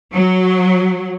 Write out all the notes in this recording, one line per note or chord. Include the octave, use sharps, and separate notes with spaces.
F#3